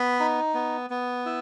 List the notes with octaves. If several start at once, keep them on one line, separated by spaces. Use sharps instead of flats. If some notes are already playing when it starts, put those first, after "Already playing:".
Already playing: B3 B5
D#4
B3
B3
E4